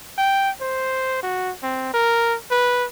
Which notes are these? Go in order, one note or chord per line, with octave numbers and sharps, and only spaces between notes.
G5
C5
F#4
C4
A#4
B4